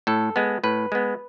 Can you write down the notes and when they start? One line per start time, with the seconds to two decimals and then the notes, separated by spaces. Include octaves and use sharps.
0.07 A2 A4
0.36 G#3 B3
0.64 A2 B4
0.92 G#3 B3